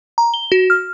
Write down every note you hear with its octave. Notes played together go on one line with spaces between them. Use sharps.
A#5
G7
F#4
F6